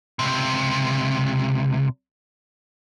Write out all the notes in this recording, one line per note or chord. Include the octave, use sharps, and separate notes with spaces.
C#2 C3